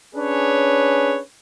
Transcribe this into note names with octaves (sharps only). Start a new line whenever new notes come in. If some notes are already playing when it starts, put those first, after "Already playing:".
C#4 D4 G#4 B4 C#5